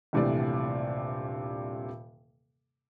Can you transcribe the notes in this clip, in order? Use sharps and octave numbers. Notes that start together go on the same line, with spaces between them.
D#1 G2 C3 E3 A3 D5